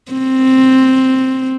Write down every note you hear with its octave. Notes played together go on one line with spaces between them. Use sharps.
C4